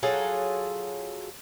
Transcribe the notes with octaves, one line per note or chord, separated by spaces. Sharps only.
F#3 F4 G#4 A4